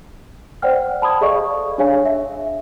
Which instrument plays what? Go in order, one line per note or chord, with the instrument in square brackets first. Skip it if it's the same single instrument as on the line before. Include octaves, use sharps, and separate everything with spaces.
[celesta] C5 D5 F#5 G5 F6
A5 B5 C6 D#6 G#6
G#4 A4 D5 D#5 F5 C#6
D4 G#4 C#5 F5 G#5
E5